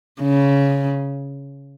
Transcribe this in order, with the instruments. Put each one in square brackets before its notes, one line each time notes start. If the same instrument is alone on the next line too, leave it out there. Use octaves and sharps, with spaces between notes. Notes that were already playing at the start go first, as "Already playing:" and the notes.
[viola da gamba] C#3